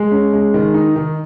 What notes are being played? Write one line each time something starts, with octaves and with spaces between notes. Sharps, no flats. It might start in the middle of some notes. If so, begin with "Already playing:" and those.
Already playing: G#3
C#4
G#3
D#3
D#4
D#3